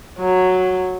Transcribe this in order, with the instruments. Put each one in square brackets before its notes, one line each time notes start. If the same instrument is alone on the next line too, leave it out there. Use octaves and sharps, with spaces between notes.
[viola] F#3